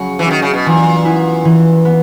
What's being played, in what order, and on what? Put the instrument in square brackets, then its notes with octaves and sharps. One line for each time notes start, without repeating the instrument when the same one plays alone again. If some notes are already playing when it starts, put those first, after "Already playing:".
Already playing: [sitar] C#3 [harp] F#3 C#4 F#4
[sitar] E3
[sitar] D#3 [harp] C#4 F#4
[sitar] C#3
B2
[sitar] A#2 [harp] E3
[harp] B3 E4
E3
B3